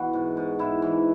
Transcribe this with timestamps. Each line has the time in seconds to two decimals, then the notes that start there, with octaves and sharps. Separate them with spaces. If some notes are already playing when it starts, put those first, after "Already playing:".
Already playing: B2 E3 F#4
0.13 G#2
0.37 G#2
0.59 G#2 E4
0.82 E3